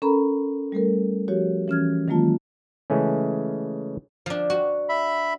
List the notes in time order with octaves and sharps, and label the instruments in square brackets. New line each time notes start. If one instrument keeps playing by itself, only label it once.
[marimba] C#4 A4 A#4 A#5 B5
G3 A3 A4 A#4
F3 F#4 G4 C#5
E3 C#4 F6 G#6
D#3 F#3 G#3 A#3 F4 A5
[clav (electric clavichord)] C#3 E3 G#3 A3 C#4
[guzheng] F3 D4
F#4
[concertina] E5 B5